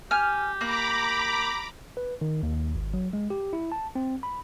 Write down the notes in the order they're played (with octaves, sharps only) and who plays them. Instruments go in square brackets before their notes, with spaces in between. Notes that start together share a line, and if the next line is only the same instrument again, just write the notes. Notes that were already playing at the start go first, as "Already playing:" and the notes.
[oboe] G4 [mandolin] G#5 F6
[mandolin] A#3 F#6 [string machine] A#5 B5 D6
[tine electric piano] B4
D#3
D#2
G#1
F#3
G#3
G4
E4
A5
C4
B5